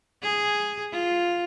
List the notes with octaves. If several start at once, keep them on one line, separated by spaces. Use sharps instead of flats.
G#4
F4